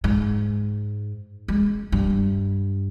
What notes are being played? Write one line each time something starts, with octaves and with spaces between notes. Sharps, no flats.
G#2
G#3
G2